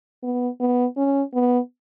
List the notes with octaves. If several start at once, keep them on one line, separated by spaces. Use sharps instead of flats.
B3
B3
C#4
B3